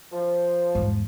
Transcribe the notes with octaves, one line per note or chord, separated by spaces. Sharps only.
F3
E2 G#2